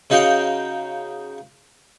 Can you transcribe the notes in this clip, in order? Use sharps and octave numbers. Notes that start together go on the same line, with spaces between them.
C#3 D#4 F#4 F5 G5